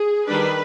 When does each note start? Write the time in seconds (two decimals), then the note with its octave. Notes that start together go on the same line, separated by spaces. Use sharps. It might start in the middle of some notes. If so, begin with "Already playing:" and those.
Already playing: G#4
0.27 D#3 G3 D4 B4